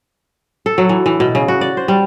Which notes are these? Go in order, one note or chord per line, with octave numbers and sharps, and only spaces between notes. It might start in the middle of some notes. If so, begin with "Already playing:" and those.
A4
F#3
E3
E3
B2
C#3
F#4
D5
C5
G3